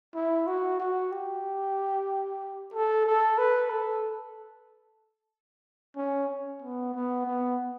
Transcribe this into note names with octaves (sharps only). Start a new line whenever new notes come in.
E4
F#4
F#4
G4
A4
A4
B4
A4
C#4
B3
B3
B3